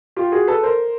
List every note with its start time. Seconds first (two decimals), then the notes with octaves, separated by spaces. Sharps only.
0.16 F4 G4
0.32 F#4 G#4
0.47 A4 B4
0.63 A#4 C5